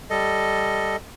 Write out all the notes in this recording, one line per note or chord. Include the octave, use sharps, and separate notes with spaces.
G3 A4 D#5